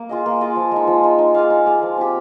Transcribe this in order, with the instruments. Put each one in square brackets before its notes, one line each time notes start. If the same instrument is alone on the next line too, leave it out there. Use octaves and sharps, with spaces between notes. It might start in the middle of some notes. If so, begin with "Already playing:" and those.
Already playing: [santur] A#3
F4 G#4 D#5
A#3
F4 G#4 D#5
F3
G#3 D#4
F3
G#3 D#4
D#4
G#4 D5 F5
D#4
G#4 D5 F5
F3
C4 G4